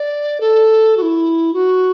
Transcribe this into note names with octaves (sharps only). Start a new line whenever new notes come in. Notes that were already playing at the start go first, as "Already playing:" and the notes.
Already playing: D5
A4
F#4
E4
F#4